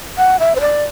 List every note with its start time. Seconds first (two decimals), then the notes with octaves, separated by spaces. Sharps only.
0.18 F#5
0.40 E5
0.56 C5
0.61 D5